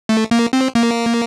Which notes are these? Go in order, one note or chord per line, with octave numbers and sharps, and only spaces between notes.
A3
A#3
C4
A#3